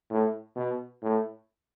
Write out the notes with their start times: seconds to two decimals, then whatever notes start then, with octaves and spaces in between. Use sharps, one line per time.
0.10 A2
0.56 B2
1.02 A2